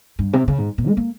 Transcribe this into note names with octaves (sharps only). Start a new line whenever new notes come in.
G2
C3
C#3
G#2
A#2
G#3
A#3